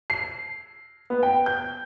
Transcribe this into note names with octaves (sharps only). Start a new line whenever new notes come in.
C7
B3
G5
G6